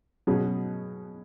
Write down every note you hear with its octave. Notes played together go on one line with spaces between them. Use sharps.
B2 F#3 C#4 G#4